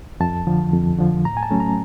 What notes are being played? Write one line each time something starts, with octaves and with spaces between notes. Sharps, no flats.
F2 A5
D3 F3
F2
D3 F3
A2 A#5
G#5
A5
F#3 A3 C#4
A#5